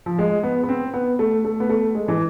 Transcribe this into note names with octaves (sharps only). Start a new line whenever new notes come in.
F3
G#3
B3
B3
C4
B3
A3
A3
B3
A3
G#3
E3